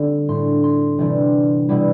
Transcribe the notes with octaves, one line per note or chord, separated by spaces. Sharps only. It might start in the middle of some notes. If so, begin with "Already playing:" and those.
Already playing: D3 G3 C4 E4
A2 G3 D4 C6
C6
C3 E3 G3 D4
B2 G3 B3 E4